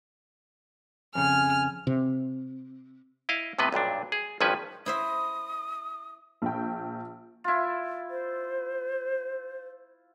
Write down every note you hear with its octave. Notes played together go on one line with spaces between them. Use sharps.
F2 C#3 G#5 F6
C3
E4 D#5 F5
A2 C3 B3 B4 D#5
B1 G2 A#2 D4
G#4
G#1 G2 F3 C#4 B4 G#5
E4 C5 E5 D#6
A#1 G5
E4 F4
C5